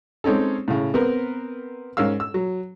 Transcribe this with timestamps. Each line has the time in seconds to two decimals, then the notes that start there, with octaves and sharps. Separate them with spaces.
0.24 G#3 C4 C#4 D#4 A4
0.68 A2 C#3
0.94 B3 C4 A#4 B4
1.97 G#2 C#4 A#4 F5 E6
2.20 E6
2.34 F#3